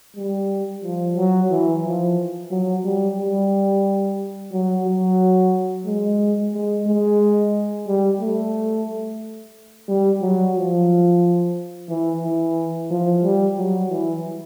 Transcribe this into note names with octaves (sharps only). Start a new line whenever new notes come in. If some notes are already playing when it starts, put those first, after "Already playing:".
G3
F3
F#3
E3
F3
F#3
G3
G3
F#3
F#3
G#3
G#3
G#3
G3
A3
G3
F#3
F3
E3
E3
F3
G3
F#3
E3